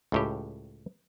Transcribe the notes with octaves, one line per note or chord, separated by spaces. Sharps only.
C#2 A2 G4